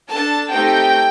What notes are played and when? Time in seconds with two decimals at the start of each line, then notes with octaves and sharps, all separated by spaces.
0.09 D4 A4 A5
0.52 A3 C4 D#4 G4 G5